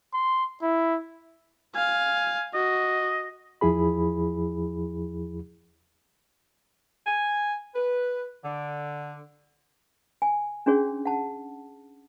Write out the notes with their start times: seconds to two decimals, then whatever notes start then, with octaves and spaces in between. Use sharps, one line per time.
0.13 C6
0.62 E4
1.75 F5 G#5
2.54 F#4 D#5
3.61 E2 F3 E4 G#4 B5
7.05 G#5
7.75 B4
8.44 D3
10.22 G#5
10.66 C#4 D4 F#4 G#4 C#5
11.06 F#5 A5